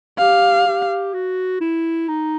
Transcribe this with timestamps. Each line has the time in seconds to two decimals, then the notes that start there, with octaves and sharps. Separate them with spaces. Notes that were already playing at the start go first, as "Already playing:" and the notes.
0.19 G4 F5
0.67 G4
1.14 F#4
1.61 E4
2.08 D#4